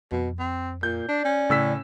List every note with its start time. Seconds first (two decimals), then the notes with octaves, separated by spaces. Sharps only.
0.12 F2 B2
0.39 C4
0.83 A#2 G6
1.08 D4 D5
1.25 C#4
1.50 A2 C#3 E6 B6